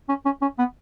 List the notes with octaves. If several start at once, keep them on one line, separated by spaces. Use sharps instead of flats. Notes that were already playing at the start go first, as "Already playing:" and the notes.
C#4
C#4
C#4
B3